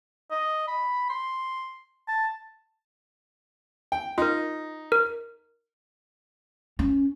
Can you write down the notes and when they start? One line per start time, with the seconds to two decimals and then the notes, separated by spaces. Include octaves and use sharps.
0.31 D#5
0.68 B5
1.10 C6
2.08 A5
3.92 G5
4.18 D#4 F4 A#4
4.92 A#4
6.79 C#4